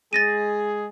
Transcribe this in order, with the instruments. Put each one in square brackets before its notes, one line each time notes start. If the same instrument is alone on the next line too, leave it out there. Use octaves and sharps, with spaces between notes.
[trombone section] G#3 G#4 [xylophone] A6 A#6 D#7